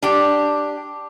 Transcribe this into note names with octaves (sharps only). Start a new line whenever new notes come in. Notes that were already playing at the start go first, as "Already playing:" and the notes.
D4 G4